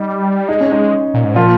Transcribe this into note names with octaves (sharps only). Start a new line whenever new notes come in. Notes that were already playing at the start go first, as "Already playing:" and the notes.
Already playing: G3 D#4
G#3 D#4
C#4
D#4
A#2
G#2
A#2 F3 F4